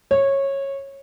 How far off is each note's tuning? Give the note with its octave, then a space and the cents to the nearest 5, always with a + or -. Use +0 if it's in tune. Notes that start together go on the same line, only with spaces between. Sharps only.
C#5 -15